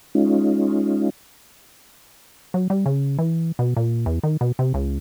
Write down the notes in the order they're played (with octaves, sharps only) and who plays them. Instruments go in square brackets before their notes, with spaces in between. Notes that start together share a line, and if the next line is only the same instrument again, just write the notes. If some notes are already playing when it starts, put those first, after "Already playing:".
[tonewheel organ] G#3 C#4 D#4 F4
[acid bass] F#3
G3
C#3
E3
B2
A#2
E2
D#3
B2
C3
C#2